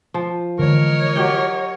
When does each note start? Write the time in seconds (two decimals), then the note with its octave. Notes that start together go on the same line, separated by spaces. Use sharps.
0.14 F3
0.59 D3 E3 G#3 A#4 C#5 D#5
1.16 F#3 G4 G5